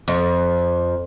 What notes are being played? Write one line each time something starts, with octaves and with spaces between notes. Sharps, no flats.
F2